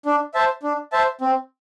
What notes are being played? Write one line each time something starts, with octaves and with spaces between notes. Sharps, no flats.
D4
C5 E5 A5
D4
C5 E5 A5
C4